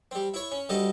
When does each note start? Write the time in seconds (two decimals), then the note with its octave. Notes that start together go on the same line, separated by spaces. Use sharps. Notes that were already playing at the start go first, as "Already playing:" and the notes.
0.11 G3 C4
0.34 E4 C#5
0.52 C#4
0.69 D2 G3 A4 D#5